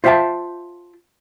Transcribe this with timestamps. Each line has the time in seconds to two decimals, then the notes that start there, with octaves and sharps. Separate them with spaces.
0.04 F4 C5 E5 F5 G5 A5